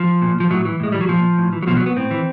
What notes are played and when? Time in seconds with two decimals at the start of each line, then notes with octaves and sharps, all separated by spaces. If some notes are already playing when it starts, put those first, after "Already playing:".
Already playing: F3
0.22 A#2
0.40 F3
0.50 A2 F#3
0.65 E3
0.80 A2 G#3
0.92 E3 G3
1.01 F#3
1.09 A#2 F3
1.38 A2
1.53 E3
1.62 F#3
1.67 B2 F3
1.77 F#3
1.86 B3
1.96 A2 C4
2.11 E3